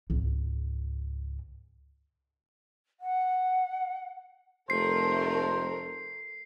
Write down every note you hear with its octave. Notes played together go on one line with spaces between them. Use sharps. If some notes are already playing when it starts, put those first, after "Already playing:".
C#2 G#2
F#5
F1 A3 A#4 C5 C7